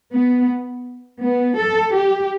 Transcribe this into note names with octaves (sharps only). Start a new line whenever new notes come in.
B3
B3
A4
G4